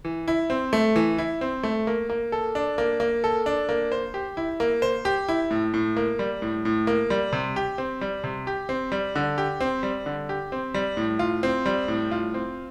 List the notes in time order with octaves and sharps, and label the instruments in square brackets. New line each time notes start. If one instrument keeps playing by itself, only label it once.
[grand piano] E3
E4
C4
A3
E3
E4
C4
A3
A#3
A#3
A4
D4
A#3
A#3
A4
D4
A#3
C5
G4
E4
A#3
C5
G4
E4
A2
A2
A#3
G3
A2
A2
A#3
G3
C3
G4
C4
G3
C3
G4
C4
G3
D3
G4
C4
G3
D3
G4
C4
G3
A2
F4
C4
G3
A2
F4
C4